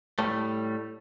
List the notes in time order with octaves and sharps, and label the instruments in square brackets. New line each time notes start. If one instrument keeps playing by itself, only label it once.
[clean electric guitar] A2 G3 A3